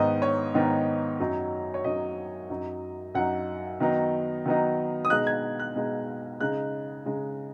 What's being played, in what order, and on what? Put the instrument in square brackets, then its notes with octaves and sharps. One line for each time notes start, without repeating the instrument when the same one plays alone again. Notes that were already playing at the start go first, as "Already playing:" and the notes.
Already playing: [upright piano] G#2 D#3 B3 D#4 D#5
C#5
G#2 D#3 B3 D#4
F#2 F#3 D#4
C#5
F#2 F#3 D#4 D#5
F#2 F#3 D#4
F#2 F#3 D#4 F#5
D#3 F#3 B3 D#4
D#3 F#3 B3 D#4
D#6
B2 G#3 D#4 F#6
G#6
F#6
B2 G#3 D#4
C#3 G#3 D#4 F#6
C#3 G#3 D#4